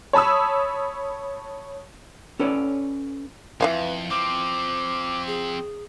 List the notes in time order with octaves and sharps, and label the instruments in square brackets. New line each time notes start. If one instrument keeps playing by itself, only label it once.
[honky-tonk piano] C#5 A5 B5 D#6 E6
[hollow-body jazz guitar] C#4 A4 B4 C#5 D5
[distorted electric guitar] F2 [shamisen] E3 F5 G5 [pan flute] B4
[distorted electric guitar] F3 C4 [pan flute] D6
[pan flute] G#4